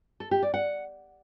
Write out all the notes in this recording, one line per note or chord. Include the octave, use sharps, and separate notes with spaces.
A4
G4
D5
F#5